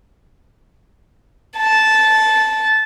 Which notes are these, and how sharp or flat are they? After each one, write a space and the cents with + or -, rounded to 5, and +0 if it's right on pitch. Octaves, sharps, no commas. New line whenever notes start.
A5 -10